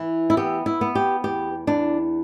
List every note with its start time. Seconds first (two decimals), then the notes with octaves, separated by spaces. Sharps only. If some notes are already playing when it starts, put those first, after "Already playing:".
Already playing: E3
0.30 E4
0.37 B3 G4
0.66 E4
0.81 B3
0.95 G4
1.24 E2 G4
1.67 E2 D4